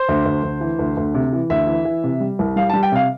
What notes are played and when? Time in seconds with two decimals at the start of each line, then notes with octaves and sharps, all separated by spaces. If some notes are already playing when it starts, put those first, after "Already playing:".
Already playing: C5
0.09 D2
0.25 D2
0.43 D2
0.61 E3
0.79 D2
0.97 D2
1.14 C3
1.33 E3
1.50 D2 E5
1.67 E3
1.85 E3
2.04 C3
2.20 G3
2.39 C2
2.56 G3 F5
2.69 G3 A5
2.83 G5
2.92 C3 F5